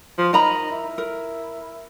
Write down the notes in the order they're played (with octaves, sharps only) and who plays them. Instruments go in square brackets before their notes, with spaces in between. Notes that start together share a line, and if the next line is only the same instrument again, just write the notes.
[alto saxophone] F3
[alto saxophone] D#4 [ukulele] A#4 A#5 B5
[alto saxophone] E4
[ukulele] A#4